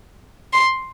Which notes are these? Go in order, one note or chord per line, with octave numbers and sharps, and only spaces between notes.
C6